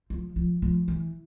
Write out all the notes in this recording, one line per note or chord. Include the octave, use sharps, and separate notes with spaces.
F3
F3
F3
E3